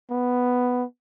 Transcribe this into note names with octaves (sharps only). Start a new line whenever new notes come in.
B3